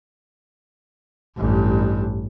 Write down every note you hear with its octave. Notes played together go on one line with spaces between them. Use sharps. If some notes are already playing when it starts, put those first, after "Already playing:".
A1 G2